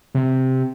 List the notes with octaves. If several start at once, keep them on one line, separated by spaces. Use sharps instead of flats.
C3